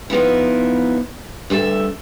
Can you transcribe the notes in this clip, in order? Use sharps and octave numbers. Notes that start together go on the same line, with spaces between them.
F3 B3 D#4 E4
D2 G2 A4 E5